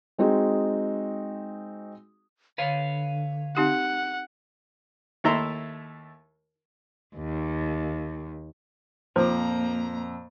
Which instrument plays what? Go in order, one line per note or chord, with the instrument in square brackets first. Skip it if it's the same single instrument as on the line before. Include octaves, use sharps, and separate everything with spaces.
[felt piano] G#3 C4 D#4 F#4 G#4
[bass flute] D3 [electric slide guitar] B4 C#5 F5
[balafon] C4 D#4 G4 [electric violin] F#5
[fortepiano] D#2 A3 E4 A#5 C6
[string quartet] D#2
[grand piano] F2 A#2 D6 [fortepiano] F3 [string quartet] A#3 A#5